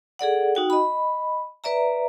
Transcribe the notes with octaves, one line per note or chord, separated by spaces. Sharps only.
G#4 A4 D5 F#5
D#4 F#4 G5
D#5 B5
B4 D5 E5 A#5